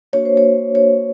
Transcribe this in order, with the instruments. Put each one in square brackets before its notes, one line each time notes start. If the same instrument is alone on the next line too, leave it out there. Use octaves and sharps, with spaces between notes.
[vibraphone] A#3 D4 F#4 C#5
C5
C#5
C#5